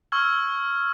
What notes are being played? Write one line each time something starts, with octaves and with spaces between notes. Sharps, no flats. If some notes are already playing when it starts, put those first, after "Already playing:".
C#6 E6 F6 G#6 G7